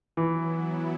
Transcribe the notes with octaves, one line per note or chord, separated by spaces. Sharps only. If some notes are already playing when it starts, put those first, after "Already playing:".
E3 F#3 B3 E4